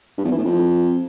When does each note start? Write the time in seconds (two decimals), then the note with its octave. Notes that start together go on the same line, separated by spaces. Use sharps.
0.18 G2
0.25 E2
0.32 E3
0.38 A2
0.45 F2